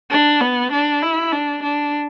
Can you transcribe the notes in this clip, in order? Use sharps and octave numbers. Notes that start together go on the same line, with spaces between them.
D4
B3
D4
E4
D4
D4